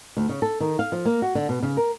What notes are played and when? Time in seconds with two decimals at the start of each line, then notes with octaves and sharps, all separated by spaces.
0.17 D2
0.29 C#3
0.42 A4
0.60 D#3
0.79 F5
0.92 F3
1.05 A#3
1.22 F#4
1.35 D3
1.49 B2
1.63 C#3
1.77 A#4